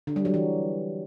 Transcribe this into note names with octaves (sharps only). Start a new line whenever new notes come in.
D3
G3
F#3
E3